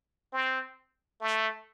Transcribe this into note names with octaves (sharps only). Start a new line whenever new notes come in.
C4
A3